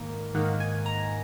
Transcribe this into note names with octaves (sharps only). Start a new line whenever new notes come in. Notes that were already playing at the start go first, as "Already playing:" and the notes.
Already playing: G#2 D#3 A#3 A#4
G#2 D#3 A#3 F#5
G#5
A#5